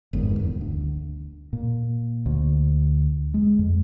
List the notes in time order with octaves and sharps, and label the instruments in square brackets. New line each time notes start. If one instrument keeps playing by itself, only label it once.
[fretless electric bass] G1 F2 G#2 D#3
D#1 E2
D2
[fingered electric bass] A#2
D2
G#3
F2